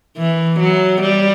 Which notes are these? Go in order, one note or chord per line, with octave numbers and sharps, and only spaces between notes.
E3
F#3
G3